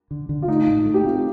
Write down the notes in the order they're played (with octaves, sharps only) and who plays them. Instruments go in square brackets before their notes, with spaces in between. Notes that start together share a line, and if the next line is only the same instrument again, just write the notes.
[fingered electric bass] D3
D3
[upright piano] F4
[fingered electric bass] A3 [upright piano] D#4
[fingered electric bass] A2
A3
[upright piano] G4
[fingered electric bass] C4 [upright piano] F4